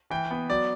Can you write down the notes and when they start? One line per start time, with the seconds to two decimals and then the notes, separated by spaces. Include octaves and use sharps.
0.10 E3 G5
0.31 B3
0.50 F#3 D5